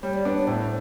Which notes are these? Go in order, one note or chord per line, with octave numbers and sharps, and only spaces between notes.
G3 C#5
D5
B3 D4 C#5
C#5
A2 C5